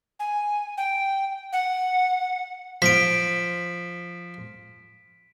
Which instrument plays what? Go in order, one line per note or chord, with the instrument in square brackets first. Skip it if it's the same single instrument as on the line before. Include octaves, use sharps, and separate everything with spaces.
[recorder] G#5
G5
F#5
[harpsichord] F3 [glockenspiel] B6 D7